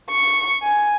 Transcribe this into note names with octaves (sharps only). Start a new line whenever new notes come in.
C#6
G#5